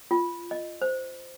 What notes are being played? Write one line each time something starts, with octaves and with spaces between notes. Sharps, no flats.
F4
D#5
C5